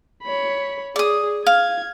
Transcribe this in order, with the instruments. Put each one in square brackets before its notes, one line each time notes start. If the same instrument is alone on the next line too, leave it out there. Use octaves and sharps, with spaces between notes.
[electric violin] C#5 B5
[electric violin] G#4 [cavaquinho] D5 D#6
[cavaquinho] F5 [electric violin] G#6